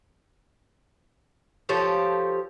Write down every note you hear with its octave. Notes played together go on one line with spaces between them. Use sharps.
F3 G4 A4 C#5